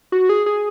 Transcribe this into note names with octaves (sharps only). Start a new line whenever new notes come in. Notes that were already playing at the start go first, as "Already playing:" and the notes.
F#4
G#4
G#4